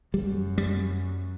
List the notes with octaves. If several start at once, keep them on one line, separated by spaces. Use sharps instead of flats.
F#2 G3
G3